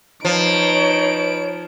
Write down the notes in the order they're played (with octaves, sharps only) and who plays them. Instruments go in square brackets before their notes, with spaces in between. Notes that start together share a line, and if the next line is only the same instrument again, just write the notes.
[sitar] F3 [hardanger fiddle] D#4 B4 [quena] C#5 [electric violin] D7